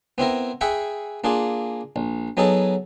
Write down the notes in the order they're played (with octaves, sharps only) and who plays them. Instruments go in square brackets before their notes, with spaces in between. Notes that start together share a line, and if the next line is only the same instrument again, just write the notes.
[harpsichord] B3 C4 E4 A#4
G#4 E5 F#5 G5 B5 C#6
A#3 D4 F4 G#4
A#1
F#3 B3 D#4 G#4 A4